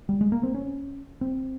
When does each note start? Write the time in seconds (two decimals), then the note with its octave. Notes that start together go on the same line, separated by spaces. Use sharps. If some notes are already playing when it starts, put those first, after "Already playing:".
0.09 G3
0.21 G#3
0.32 A#3
0.43 C4
0.54 C#4
1.21 C4